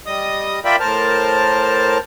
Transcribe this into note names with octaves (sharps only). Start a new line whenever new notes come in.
G3 D#5 D#6
F4 A#4 D5 E5 G5 B5
A2 A#4 C5 A5 F6